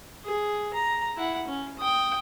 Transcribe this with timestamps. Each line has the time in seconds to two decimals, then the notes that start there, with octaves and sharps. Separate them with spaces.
0.24 G#4
0.73 A#5
1.17 E4 F#5
1.47 C#4
1.79 G5 D#6